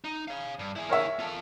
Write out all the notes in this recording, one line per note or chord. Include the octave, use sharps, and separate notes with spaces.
D#4
C#5 F5
G2
E4 G#4
A#4 C#5 E5
F4 A4